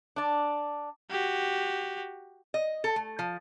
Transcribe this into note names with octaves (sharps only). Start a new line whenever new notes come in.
D4 D5
F#4 G4
D#5
A4
A3
F3